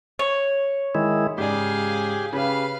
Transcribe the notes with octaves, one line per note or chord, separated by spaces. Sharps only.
C#5
D#3 G#3 E4
G#2 C#3 G4 G#4 D5 F5
C#3 G4 B4 F5